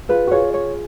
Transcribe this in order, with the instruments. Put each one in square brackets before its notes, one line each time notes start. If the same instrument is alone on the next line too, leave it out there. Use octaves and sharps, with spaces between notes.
[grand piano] F4 G#4 [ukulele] B4
[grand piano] F#4
[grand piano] F4 G#4 [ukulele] C#5
[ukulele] C#5